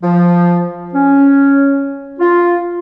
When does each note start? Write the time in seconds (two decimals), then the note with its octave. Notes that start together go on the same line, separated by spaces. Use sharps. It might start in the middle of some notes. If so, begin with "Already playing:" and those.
0.02 F3
0.94 C#4
2.20 F4